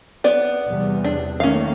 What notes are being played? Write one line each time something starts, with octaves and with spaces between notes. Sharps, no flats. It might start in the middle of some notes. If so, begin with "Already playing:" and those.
B3 D5
E2 C3 G3
D4
D#3 A3 A#3 C#4 F5